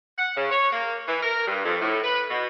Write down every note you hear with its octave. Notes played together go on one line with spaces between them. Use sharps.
F#5
C#3
C#5
A#3
E3
A#4
G2
F2
A2
B4
B2